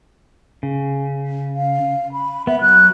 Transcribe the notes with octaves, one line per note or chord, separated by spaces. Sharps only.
C#3
F5
B5
B3 E5
F#3 F#6